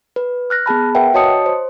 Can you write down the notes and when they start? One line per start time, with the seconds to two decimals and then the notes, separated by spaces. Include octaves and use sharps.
0.16 B4
0.50 F6 F#6 A#6
0.66 B3 G#4 A5 B5
0.95 A#4 B4 E5 F#5 G5
1.14 F#4 C#5 D#5 A5 D#6 C#7
1.46 C5